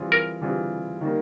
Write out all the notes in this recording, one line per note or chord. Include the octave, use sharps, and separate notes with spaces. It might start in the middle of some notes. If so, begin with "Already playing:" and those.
Already playing: E3 G3 C4 F4 G#4
A#4
E3 G3 C4 F4 G#4
D#3 G3 A#3